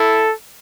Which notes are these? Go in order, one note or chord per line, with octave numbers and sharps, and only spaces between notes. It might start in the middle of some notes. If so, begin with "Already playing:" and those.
Already playing: E4 A4